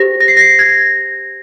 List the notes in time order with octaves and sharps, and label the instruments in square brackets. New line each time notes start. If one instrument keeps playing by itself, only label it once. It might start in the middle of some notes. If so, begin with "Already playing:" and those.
Already playing: [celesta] G4 C5 A#6
A#6
C7
A#6
G#6